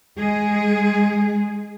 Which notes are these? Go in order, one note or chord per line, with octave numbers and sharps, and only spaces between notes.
G#3 G#4